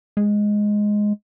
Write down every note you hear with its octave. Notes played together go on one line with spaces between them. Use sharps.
G#3